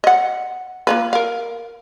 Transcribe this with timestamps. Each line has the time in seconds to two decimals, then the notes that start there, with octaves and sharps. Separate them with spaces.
0.04 D#5 F#5
0.87 A#3 F4 B4
1.13 A#4 F5